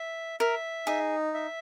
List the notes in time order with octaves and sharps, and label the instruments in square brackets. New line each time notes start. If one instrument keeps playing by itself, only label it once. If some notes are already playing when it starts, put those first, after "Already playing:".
Already playing: [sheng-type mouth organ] E5
[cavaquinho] A#4 [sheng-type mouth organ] E5
[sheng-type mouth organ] D#4 [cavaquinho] G#4
[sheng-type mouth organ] E5